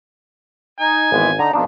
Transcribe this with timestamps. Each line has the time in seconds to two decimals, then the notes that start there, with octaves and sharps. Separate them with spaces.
0.80 D#4 G#5
1.12 G#1 E3 G#3 B3
1.39 D3 D#4 A#5
1.53 F2 B2 D4 D#4 F4